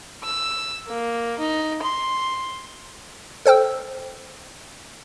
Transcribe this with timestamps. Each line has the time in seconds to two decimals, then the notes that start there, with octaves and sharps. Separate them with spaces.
0.23 E6
0.86 A#3
1.39 D#4
1.83 C6
3.46 A4 C5 G5 E6